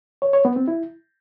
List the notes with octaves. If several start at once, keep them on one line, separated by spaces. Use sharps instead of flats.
C#5
C#5
B3
C4
E4